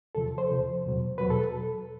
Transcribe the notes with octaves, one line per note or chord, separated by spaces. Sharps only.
E2 C3 F3 A4
C5
E2 C3 F3
E2 B2 F#3
E2 B2 F#3 B4
A4